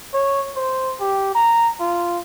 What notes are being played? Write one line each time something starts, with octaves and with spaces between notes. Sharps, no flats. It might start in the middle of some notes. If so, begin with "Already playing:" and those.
C#5
C5
G4
A#5
F4